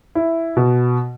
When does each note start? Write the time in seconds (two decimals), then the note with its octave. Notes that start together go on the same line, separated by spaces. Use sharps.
0.15 E4
0.57 B2